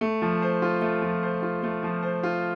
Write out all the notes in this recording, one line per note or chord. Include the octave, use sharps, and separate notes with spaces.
A3
F3
C5
F4
A3
F3
C5
F4
A3
F3
C5
F4